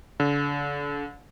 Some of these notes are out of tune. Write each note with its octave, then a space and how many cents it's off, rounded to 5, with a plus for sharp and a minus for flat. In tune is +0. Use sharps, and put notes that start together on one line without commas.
D3 -35